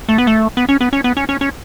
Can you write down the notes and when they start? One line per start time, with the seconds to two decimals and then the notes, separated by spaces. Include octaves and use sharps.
0.09 A3
0.18 B3
0.27 A3
0.57 B3
0.69 C#4
0.81 B3
0.93 C#4
1.04 B3
1.17 C#4
1.29 C#4
1.41 C#4